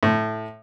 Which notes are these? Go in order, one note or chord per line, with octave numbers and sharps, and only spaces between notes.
A2